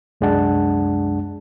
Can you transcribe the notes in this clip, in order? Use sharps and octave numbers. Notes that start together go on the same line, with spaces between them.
C2 F#2 G#3 D4 F#5 A5